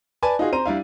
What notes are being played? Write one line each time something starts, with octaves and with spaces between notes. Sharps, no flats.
B4 D5 G#5 A5
D#4 F4 F#4 G#4
C4 C5 A#5 D#7
G3 D4 E4 F5